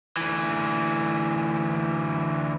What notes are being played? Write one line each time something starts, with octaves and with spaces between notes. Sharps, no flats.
D2 E3